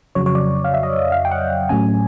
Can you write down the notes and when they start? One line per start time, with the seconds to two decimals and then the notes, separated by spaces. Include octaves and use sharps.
0.15 F2 C#3 F#3 C#5
0.26 C#5
0.35 D5
0.64 F5
0.74 E5
0.83 D#5
1.12 F5
1.25 G5
1.31 F#5
1.69 A2 F#3 A3 C#4 G#5